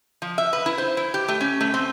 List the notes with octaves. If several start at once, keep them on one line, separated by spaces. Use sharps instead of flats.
F3
E5
B4
E4
C5
E4
G4
A3
C#4
A3
C4